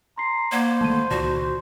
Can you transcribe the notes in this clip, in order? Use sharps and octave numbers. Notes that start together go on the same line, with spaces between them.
A#5 C6 C7
A#3 C5 D5 F#5 G#6
D#3 G#3 A3 A5 D#7
C#2 A#2 D#3 F4 F#4 D5 A5